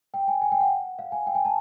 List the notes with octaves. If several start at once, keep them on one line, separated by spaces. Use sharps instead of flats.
G5
G#5
G#5
G5
F#5
F5
G#5
G5
G#5
A5